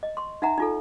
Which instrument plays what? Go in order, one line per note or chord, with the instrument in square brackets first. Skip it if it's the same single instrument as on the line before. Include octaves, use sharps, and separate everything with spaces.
[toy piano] D#5
C6 C#6
D#4 E5 F#5 A#5
D#4 F4 A4